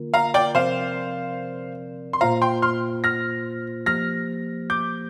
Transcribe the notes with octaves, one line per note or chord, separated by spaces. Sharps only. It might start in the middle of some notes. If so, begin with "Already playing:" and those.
Already playing: D3 A#3 F4 A#4
F5 A#5
D5 G5
C3 F3 C4 A#4 C5 D5 F5
C6
A#2 A#3 F4 C5 F5 A#5
G5 C6
C6 F6
F6 A#6
F3 A#3 G4 C5 F6 A#6
D6 G6